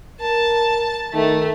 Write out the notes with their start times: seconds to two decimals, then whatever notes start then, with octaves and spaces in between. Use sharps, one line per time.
0.20 A#4 A5
1.14 D#3 A3